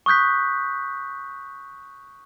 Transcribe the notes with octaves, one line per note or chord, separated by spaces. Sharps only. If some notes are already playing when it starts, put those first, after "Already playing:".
C#6 D#6 F#6 G6 B6